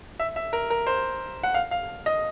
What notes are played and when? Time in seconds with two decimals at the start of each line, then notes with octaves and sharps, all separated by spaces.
0.20 E5
0.36 E5
0.53 A#4
0.70 A#4
0.87 C5
1.43 F#5
1.54 F5
1.71 F5
2.06 D#5